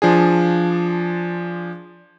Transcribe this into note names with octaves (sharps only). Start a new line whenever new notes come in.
F3 D4 G#4